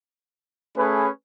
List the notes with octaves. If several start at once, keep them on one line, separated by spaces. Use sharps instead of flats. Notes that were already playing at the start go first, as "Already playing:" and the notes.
A3 C#4 G#4 B4